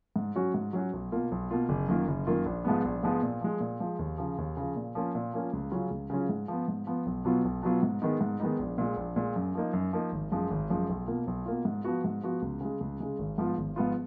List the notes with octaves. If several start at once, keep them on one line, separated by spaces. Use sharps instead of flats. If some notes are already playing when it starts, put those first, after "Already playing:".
G#2
F#3 C#4 F#4
G#2
F#3 C#4 F#4
B1
B2 A#3 F4
B1
B2 A#3 F4
F#1
F#2 D#3 A#3 F4
F#1
F#2 D#3 A#3 F4
A#1
G#2 F3 G#3 B3
A#1
G#2 F3 G#3 B3
A#2
F3 G#3
A#2
F3 G#3
D#2
C#3 F3
D#2
C#3 F3
A#2
F3 A#3 C#4 F4
A#2
F3 A#3 C#4 F4
C#2
C#3 F#3 C#4 F4
C#2
C#3 F#3 C#4 F4
G#2
F3 B3
G#2
F3 B3
B1
B2 F#3 B3 F4
B1
B2 F#3 B3 F4
G#2
D#3 G#3 B3 D#4
G#2
D#3 G#3 B3 D#4
A#1
A#2 G#3
A#1
A#2 G#3
F#2
F3 A#3 D#4
F#2
F3 A#3 D#4
G#1
F#2 F3 G#3
G#1
F#2 F3 G#3
B1
B2 A#3 F4
B1
B2 A#3 F4
G#2
F3 B3 F#4
G#2
F3 B3 F#4
C#2
C#3 G#3
C#2
C#3 G#3
G#1
G#2 F3 B3 F4
G#1
G#2 F3 B3 F4